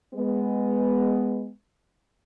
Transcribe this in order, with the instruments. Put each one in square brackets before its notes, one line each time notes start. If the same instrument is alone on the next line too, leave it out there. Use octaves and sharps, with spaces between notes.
[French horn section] G#3 B3